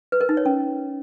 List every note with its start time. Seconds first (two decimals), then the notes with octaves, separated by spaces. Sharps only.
0.12 B4
0.21 A#4
0.29 D#4
0.37 C#5
0.46 C#4